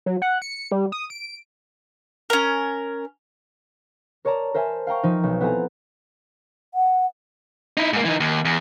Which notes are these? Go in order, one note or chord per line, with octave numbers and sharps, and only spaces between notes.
F#3
F#5
C#7
G3
D#6
D7
C#4 A#4
A#4 C#5 D5 A5 A#5
A#4 C5 E5 G#5 A5
F5 G5 A#5 C#6
F3 D#4
B1
B3 C4 E4 A4 G#5 A#5
F#5
D#4 E4
G#2 A#3
E3 D#4
D#2
E2